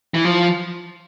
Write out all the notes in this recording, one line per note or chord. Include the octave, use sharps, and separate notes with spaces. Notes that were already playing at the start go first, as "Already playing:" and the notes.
E3
F3